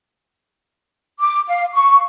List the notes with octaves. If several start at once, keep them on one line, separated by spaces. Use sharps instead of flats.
D6
F5
C#6